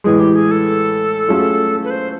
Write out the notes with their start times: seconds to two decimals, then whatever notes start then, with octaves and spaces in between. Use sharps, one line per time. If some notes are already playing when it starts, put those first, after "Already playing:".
0.04 A2 E3 G#3 G#4
0.20 G4
0.35 G#4
0.51 A4
1.29 F#3 A3 C#4 F4 G#4
1.84 B4
1.90 C5